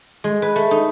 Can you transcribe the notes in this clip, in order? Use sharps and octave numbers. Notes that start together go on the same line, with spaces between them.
G#3
B4
A3
D#4